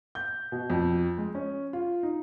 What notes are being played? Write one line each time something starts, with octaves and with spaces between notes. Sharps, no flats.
G6
B2
F2
G#3
C#4
F4
D#4